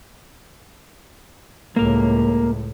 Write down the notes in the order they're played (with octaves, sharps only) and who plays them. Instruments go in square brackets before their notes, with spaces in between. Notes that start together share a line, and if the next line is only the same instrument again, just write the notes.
[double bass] C#2 A2 [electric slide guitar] A#3 A#4